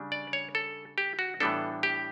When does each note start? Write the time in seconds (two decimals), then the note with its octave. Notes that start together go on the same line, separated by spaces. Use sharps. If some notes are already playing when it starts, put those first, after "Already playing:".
Already playing: C#3 G3 D4
0.12 D5
0.33 C#5
0.55 A4
0.98 G4
1.19 F#4
1.40 A2 E3 G3 B3 D4 A4
1.83 G4